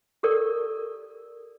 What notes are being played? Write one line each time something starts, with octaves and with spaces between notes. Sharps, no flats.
G4 A4 A#4 D5